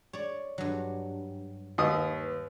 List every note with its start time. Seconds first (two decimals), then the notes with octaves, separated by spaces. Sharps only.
0.13 C#5 D5
0.58 G2 F#3
1.78 D#2 B4 D#6